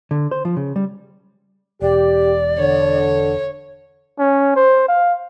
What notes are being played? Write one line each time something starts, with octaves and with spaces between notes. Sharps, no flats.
D3
C5
F3
C#3
G3
E1 G4 D5
D3 C#5
C#4
C5
F5